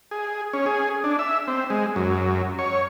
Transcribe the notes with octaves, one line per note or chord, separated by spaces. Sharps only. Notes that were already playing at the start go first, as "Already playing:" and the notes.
G#4
C#4
G#4
D4
E5
C4
G#3
F#2
C#5